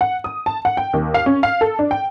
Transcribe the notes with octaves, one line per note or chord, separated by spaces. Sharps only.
F#5
D#6
A5
F#5
G5
D#2
F5
C#4
F5
A4
D4
G5